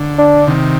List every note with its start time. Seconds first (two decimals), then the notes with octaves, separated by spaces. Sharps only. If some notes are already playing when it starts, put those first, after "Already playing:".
Already playing: D3
0.19 D4
0.47 C3 D#3